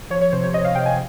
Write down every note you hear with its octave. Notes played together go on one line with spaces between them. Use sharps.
F3 C#5
C#5
C3 C5
C#5
C3 D#5
F5
C3 G5
G#5